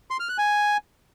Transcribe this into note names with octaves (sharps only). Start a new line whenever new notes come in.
C6
F6
F#6
G#5